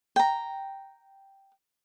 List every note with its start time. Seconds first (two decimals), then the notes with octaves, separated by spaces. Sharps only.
0.16 G5 A#5